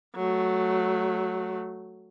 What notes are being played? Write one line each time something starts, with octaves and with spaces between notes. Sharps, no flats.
F#3 A3